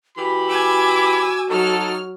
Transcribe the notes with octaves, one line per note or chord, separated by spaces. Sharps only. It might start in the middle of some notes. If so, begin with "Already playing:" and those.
E3 F#4 G4 B5
G#5 D6 E6
F#3 D#4 A4 F6